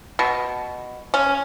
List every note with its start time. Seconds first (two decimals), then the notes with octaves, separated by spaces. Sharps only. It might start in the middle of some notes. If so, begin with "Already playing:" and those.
0.19 B2
1.14 C#4